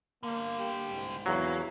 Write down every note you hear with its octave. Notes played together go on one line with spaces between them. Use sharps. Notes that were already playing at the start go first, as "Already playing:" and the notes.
D3 G3 A#3
G4
C2 G#2
E2 F#3 A#3 E4